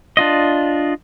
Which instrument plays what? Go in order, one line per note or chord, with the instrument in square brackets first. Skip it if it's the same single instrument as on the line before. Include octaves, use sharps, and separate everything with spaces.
[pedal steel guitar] D4 F4 D#5